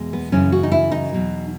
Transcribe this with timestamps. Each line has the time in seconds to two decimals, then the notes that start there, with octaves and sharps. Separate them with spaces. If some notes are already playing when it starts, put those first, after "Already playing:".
Already playing: E2 B2 G#3
0.13 B3
0.32 F#2 C#3 E3 C#4
0.52 F#4
0.63 D#4
0.72 E4
0.91 D#4
1.12 E2 B2 F#3